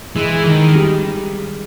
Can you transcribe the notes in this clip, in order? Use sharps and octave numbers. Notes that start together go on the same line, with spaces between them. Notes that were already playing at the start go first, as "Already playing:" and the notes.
E3 G#3
D#3
G3